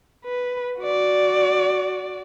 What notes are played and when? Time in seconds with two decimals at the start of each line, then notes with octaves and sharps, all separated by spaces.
0.25 B4
0.81 F#4 D5